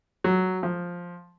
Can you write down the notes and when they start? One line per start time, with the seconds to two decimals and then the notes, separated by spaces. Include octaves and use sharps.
0.24 F#3
0.63 F3